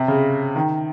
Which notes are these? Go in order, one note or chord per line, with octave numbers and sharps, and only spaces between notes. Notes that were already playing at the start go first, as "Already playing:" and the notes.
Already playing: C3
C#3
D#3